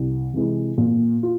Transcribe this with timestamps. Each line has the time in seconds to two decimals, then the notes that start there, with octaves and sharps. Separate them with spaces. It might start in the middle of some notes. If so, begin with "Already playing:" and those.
Already playing: C2
0.33 C3 E3 G#3
0.78 A#2
1.23 F4